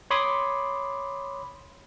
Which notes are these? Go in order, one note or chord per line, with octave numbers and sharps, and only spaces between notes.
C#5 B5 C6 D6 D#6